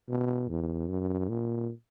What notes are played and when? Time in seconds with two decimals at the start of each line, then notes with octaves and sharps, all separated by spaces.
0.08 B2
0.48 E2
0.88 F#2
1.29 A#2